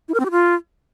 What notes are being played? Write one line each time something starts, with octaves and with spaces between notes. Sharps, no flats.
E4
A#4
C4
G4
F4